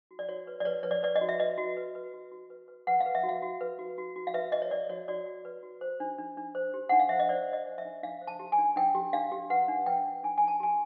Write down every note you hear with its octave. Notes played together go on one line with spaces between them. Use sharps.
F#4
D5
F#4 C#5
B4
D5
B4 C#5
B4 C#5
D5
B4 D5
D#5
F#4
E5
B4 D#5
F#4
B4
B4
F#4
F#4
B4
B4
B4 F#5
F5
B4
E5
F#4
F5
F#4
B4
F#4
F#4
F#4
F5
B4 E5
B4 D#5
C#5
B4 D5
F#4 C#5
F#4 D5
F#4
B4
F#4
C5
D4
D4
D4
C5
G4
D4 F#5
F5
C5 E5
D#5
C5 D5
C5
D#5
C5
E5
D4
D4 F5
C5
A5
G4
G#5
D4
D4 G5
G4
D4 F5
G4
B4 F#5
D4
B4 G5
D4
D4 G#5
G#5
D4 A5
G4 G#5